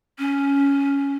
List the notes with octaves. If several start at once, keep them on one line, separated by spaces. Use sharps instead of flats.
C#4